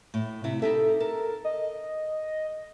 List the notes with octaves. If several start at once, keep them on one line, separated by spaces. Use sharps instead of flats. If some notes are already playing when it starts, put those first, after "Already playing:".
A2
C3 E4
D#4 G4 A4 E5
A4 A#4
D#5